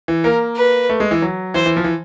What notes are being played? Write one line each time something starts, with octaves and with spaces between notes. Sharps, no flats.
E3
A#3 A#4
B4
A3
G#3
E3
F#3
E3 C5
E3
F3
E3